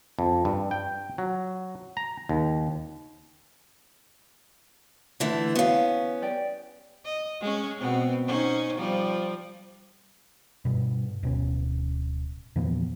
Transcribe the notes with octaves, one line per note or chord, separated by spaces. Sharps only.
F2
G2
G5
F#3
A#5
D#2
D3 E3 A3
B3 C#4 F#4 F5
G4 D5 G5
D#5
G#3 C#4
B2 B3 C4
C#4 D#4 C5
F3 G3
G2 B2
D1 B2 C#4
E2 A#2 F3 B3